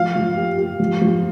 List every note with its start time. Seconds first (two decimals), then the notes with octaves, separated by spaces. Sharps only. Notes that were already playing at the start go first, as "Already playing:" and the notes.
Already playing: F3 F5
0.16 F3
0.36 G4
0.58 G4
0.80 F3
1.02 F3